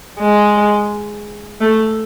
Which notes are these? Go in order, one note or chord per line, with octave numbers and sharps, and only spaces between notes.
G#3
A3